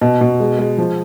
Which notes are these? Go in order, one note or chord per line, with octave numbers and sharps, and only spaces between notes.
B2
B2
G#3
G#3
F3